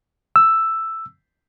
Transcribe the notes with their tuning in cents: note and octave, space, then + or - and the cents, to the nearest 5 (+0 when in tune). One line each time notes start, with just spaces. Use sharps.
E6 +5